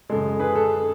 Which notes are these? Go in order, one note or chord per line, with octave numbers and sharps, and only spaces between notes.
F#2 C#3 G#3 A4
G#4 B4
A4